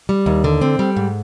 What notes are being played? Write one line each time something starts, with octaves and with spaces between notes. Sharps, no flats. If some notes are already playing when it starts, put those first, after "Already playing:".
G3
D#2
D3
C4
G3
G#2